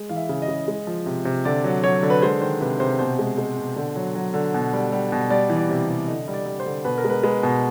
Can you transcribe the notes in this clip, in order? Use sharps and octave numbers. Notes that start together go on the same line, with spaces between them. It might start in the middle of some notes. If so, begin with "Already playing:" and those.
Already playing: G#3
E3 F5
E5
C#3
D#5
C#3
G#3
F3
C3
C3
D3 D5
F#3
F#3 C#5
D3
B4
G#3 C5
D#3 C5
C3 B4
C3 C5
B2 C5
G#3
G#3
B2
D3
F#3
F#3
D3
B2
G3
G3
B2
G3 D5
E3
D5
C3
C3
D3 D#5
G3
D5
G3
C5
D3
B2 B4
A#4
G#3
B4
G#3 B4
B2